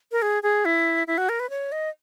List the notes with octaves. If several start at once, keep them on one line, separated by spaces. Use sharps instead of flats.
A#4
G#4
G#4
E4
E4
F#4
A#4
B4
C#5
D#5